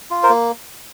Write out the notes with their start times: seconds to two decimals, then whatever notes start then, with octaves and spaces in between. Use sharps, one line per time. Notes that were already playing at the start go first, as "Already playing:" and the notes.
0.11 F4
0.23 A#4 C5
0.30 A#3